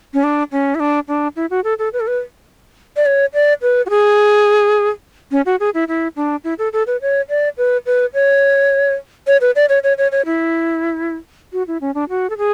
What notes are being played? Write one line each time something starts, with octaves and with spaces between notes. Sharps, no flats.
C#4
D4
C#4
E4
D4
D4
E4
F#4
A4
A4
B4
A4
B4
D5
C#5
D5
B4
F#4
G#4
C#4
F#4
G#4
E4
E4
D4
E4
A4
A4
B4
C#5
D5
B4
B4
C#5
C#5
B4
D5
C#5
C#5
C#5
C#5
E4
F#4
E4
C#4
D4
F#4
A4
G#4